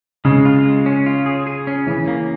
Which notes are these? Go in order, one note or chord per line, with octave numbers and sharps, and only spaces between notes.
C#3 G#3
F4
G#3
C#4
F4
G#4
G#4
C#4
C#3 E3
A#3